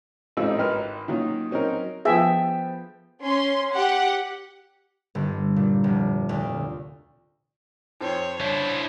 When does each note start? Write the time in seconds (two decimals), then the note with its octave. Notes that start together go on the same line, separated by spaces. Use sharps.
0.37 A1 G#2 C4 D#4 F4 E6
0.59 G#1 A#4 B4 F6
1.08 D#3 F#3 A#3 C#4 F4
1.51 F#3 C4 C#4 D#4 A#4
2.05 F3 B3 G#4 E5 G5
3.22 C#4 C6
3.73 G4 F#5
5.15 G1
5.56 A#2
5.84 F1
6.29 D2
8.01 F2 C5 C#5 G5
8.40 D4 E4 C5 C#5